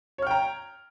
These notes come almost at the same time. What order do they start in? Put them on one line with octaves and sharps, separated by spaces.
C#5 F6 G5 A#5